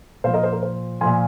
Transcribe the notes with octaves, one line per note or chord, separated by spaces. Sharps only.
A#2 F3 C5 F5
A#4 D#5
C5
A#4
C5
A#2 F3 G#5 C6